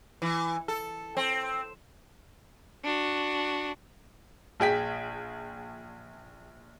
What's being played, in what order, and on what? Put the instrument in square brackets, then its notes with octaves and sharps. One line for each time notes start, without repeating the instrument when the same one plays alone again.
[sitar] E3
A4
C4
[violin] D4 F#4
[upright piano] A#1 G#4 G5 B6